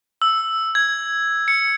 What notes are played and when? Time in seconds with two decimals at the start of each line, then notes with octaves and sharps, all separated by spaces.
0.22 E6
0.75 G#6
1.48 C#7